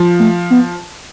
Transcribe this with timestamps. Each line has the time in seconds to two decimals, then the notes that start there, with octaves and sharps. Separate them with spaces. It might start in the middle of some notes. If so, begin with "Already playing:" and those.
Already playing: F3
0.20 A3
0.50 B3